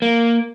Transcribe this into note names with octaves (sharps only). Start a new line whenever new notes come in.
A#3